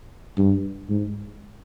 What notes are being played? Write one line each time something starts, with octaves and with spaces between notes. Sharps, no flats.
G2
G#2